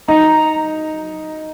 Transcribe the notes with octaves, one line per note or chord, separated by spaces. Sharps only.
D#4 A#5